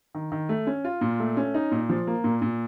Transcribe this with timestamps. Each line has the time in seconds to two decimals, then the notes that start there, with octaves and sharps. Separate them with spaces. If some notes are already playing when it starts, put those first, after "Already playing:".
0.15 D#3
0.32 D#3
0.49 A3
0.67 C#4
0.84 F4
1.01 A#2
1.20 A3
1.37 C#4
1.54 D#4
1.72 A#2
1.89 F3
2.07 A#3
2.24 A#2
2.42 A#2